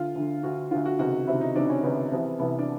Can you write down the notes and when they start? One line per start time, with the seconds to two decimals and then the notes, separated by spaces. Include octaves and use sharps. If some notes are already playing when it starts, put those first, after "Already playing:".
Already playing: D2 D3 F4
0.16 D2 D3
0.43 D2 D3 F#4
0.71 D2 D3 F4
0.85 F#4
0.99 C#2 C3 D#3 F#4
1.27 C#2 C3 D#3 E4
1.41 D#4
1.55 C#2 C3 D#3 D4
1.70 C#4
1.83 C#2 C3 D#3 B3
2.12 C2 C3 E3
2.39 C2 C3 E3 B3
2.59 D4